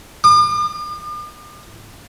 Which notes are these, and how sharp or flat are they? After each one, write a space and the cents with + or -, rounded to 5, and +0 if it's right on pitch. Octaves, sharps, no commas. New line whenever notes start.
D6 +45